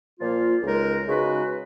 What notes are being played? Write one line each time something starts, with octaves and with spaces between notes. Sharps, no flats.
A#2 F3 A#3 F4
C#2 C#3 G#3 D#4 A#4
C#3 G#3 D#4 F#4 B4